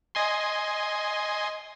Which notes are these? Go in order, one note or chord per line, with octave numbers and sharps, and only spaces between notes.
D#5 G#5 C6